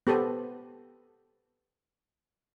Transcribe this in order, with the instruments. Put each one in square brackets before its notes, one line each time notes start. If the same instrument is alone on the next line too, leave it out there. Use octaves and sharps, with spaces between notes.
[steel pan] B3 G4 A4 B4 C5